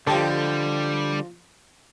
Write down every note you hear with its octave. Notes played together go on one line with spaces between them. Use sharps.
D3 F3 G3 G4 A4 D#5 A5